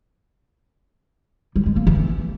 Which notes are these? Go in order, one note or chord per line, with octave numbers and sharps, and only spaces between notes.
G3
G#3
A#3
E3